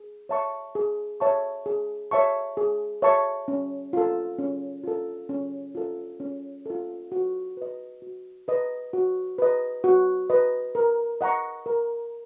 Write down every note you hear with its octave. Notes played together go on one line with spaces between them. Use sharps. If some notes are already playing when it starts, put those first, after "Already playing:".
Already playing: G#4
C#5 E5 A5 C#6
G#4
C#5 E5 A5 C#6
G#4
C#5 E5 A5 C#6
G#4
C#5 E5 A5 C#6
C#4
F4 A4
C#4
F4 A4
C#4
F4 A4
C#4
F4 A4
F#4
B4 D#5
F#4
B4 D#5
F#4
B4 D#5
F#4
B4 D#5
A#4
D#5 F#5 A#5 C#6
A#4